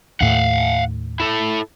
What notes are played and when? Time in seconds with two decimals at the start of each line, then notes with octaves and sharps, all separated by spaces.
0.21 D#2 A2 D#3 F5 F#5
1.20 E4 A4